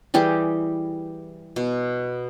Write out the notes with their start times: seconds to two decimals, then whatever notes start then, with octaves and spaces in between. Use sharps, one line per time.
0.14 E3 G3 G4 G#4
1.56 B2